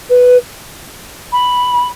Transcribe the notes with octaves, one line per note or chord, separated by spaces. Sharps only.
B4
B5